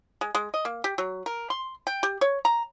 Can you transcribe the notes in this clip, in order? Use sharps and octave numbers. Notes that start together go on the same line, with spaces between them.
G#3
G#3
D#5
A#3
G4
F#3
A#4
C6
G5
G4
C#5
A#5